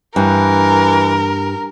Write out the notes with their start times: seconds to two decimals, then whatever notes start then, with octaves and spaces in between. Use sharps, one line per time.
0.16 G2 E3 A#4